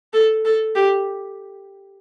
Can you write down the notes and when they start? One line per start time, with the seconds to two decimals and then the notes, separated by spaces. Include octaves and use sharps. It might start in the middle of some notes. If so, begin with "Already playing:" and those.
0.13 A4
0.45 A4
0.75 G4